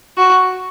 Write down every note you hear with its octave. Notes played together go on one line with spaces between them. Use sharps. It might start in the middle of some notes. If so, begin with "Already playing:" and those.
F#4